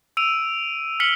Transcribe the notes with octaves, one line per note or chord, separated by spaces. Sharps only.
E6 D7 D#7 F7
F6 B6 C#7 F#7 G7